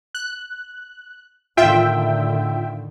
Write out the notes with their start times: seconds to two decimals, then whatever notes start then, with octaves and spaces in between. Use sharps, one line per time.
0.14 F#6
1.57 A2 D3 D#3 F4 E5 G5